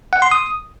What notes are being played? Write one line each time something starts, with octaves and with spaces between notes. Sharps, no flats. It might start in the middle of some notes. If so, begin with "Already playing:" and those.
F#5
C6
D#6